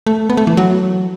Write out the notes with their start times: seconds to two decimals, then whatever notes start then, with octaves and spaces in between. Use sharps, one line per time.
0.07 A3
0.30 B3
0.37 A3
0.47 E3
0.57 F#3